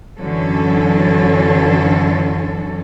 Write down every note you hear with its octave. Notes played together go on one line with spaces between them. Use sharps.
F#2 D3 E3 F#3 C#4 A4